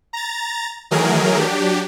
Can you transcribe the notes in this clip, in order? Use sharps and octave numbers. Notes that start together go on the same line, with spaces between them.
A#5 A6
D#3 E3 F#3 A3 G#4 A#4
F#3 D4 G4